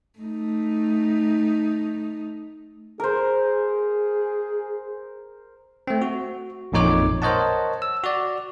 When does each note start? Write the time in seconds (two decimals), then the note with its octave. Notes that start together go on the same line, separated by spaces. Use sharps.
0.19 A3 D#4
3.00 G#4 A#4 C5
5.87 A3 C4
6.02 F#4
6.72 A1 F2 A#2 D#4 C#5 D6
7.22 A#4 C5 C#5 D#5 F#5 A5
7.82 E6
8.04 F#4 D5